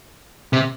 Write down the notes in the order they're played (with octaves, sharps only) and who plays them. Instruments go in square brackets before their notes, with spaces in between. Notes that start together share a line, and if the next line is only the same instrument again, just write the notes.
[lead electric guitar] C3